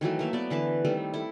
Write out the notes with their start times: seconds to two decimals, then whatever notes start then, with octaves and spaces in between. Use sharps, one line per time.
0.01 D#3 E3 F#3 A3
0.19 A3 A#3 E5
0.33 B3 D5
0.50 D3 E3 B4 A5
0.85 D#3 G3 A3 C4
1.14 E4 A4